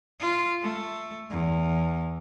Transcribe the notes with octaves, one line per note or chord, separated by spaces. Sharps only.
F4
A3
E2